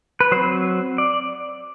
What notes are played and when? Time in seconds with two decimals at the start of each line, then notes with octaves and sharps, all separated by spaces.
0.21 B4
0.31 F#3 C4 C5
0.98 D5